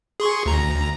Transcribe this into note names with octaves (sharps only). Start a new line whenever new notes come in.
G#4 C6 C#6
D2 A#5